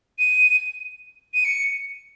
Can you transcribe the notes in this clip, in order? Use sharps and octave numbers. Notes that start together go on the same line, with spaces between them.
D#7
D#7
C#7